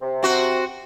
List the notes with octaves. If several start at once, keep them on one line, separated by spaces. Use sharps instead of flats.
C3
C4 F#4